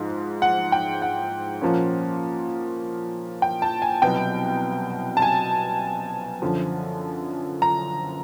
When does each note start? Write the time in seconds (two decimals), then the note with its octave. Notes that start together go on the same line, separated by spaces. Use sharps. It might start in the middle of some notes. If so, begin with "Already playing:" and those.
Already playing: G#2 F3
0.42 F#5
0.72 G5
1.02 F#5
1.62 A#2 F3 A#3 C#4
3.42 G5
3.62 A5
3.82 G#5
4.02 C2 B2 F#3 B3 G5
5.17 A5
5.22 G#5
6.42 F#2 D3 F3
7.62 A#5